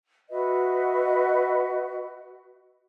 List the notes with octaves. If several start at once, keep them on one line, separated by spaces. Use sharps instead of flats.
F#4 B4 D#5 E5